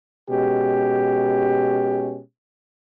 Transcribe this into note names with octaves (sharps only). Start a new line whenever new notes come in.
B2 G#3 C#4 G4